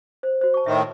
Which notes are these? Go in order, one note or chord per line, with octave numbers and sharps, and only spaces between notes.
C5
F#4 C5
A5 C#6
A2 D#3 E5 C6